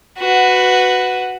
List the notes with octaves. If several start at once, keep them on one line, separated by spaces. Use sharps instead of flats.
F#4 B4